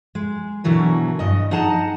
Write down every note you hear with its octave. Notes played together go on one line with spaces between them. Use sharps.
G#3
B2 D3 E3 F#3 A#4
G2 D#5
D#4 G#4 F#5 A5 A#5